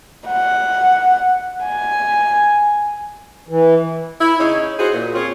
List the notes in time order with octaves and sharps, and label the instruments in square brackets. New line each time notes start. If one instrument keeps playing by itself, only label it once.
[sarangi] F#5
G#5
[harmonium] E3
[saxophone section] E4
C#3 C#4 D#4 C#5
E4 F#4 G#4 C5
A#2
C4 C#4 F4 G#4 C#5